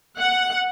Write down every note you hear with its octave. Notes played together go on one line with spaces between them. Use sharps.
F#5